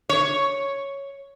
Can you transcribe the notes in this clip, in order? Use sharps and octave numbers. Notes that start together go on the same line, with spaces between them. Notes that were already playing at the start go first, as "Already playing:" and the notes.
C#5